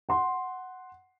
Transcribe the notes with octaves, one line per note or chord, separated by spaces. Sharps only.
F#5 C6